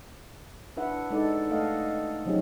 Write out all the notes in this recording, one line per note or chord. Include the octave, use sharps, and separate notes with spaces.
D4 E4 B4 E5 F#5
G#3 D#4 A4 D5
A3 A4 D#5 F5 F#5
F3 F#3 C#4 D#4 G4 G#4